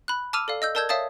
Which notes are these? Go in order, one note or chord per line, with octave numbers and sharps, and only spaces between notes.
B5 F#6
A5 D6 E6 F6 D#7 F7
A4 D5 F5
D#5 E6 G6
A#4 D5 A5 E6 G6 G#6
C#5 E5 F5 A5 D#6 A6